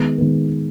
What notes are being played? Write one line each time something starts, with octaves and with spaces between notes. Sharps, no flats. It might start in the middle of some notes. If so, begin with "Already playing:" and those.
Already playing: D#3 G#3 B3
D#3 G#3 B3